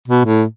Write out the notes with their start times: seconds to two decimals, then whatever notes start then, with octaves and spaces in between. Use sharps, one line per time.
0.08 B2
0.25 A2